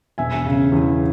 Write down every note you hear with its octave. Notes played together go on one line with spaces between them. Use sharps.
E1 E5 G#5
C#3
E2